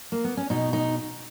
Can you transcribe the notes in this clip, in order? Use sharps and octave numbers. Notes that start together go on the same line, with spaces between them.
A#3
B3
C#4
B2 D#4
D#4